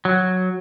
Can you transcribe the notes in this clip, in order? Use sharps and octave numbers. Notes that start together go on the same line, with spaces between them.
F#3